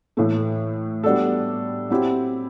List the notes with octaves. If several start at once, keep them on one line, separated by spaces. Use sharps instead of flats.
A2 E3 A3
G3 B3 D4 F#4 A4
F#3 C4 E4 G4